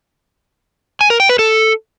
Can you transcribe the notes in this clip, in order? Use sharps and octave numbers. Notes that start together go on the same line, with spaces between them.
G#5
A#4
G5
B4
A4